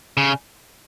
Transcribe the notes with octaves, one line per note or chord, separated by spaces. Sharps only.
C#3